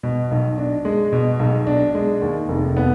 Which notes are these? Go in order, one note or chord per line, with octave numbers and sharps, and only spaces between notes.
B2
B1
D4
G#3
B2
B1
D4
G#3
D#2
F1
B3